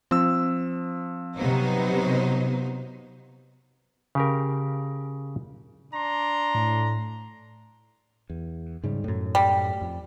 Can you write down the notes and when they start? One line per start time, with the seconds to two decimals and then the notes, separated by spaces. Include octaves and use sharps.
0.11 F3 C4 E6
1.37 C3 F#3 B3 D#4 C5
4.15 C#3 G4 A#4
5.94 D4 A#5 C6
6.54 A2
8.30 E2
8.83 G#2 C#3 G3
9.04 F#2 A2
9.35 G3
9.81 F2